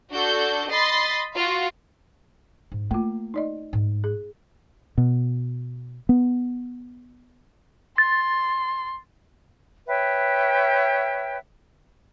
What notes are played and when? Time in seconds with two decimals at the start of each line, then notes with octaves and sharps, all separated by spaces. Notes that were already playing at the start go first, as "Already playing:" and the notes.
0.11 D4 F#4 A4 G6
0.71 D#5 B5 C6 A6 C7
1.34 F4 F#4
2.72 G#2
2.91 A3 A#3 F4
3.34 D#4 D5 D#5
3.73 G#2
4.04 G#4
4.98 B2
6.09 B3
7.98 C6 A6
9.88 B4 C#5 E5 G5